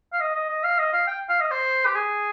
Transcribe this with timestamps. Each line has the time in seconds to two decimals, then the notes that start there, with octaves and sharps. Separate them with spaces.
0.13 F5
0.20 D#5
0.34 D#5
0.49 D#5
0.63 F5
0.78 D#5
0.93 F5
1.07 G5
1.29 F5
1.40 D#5
1.51 C5
1.85 G4
1.94 G#4